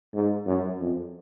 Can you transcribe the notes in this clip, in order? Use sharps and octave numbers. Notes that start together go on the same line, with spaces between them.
G#2
F#2
F2